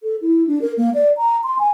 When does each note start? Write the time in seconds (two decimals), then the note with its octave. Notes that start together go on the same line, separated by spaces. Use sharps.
0.03 A4
0.21 E4
0.47 D4
0.62 A#4
0.77 A#3
0.95 D5
1.17 A#5
1.44 C6
1.59 G#5